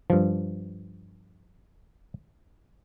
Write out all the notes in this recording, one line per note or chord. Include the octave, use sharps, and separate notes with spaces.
G2 F3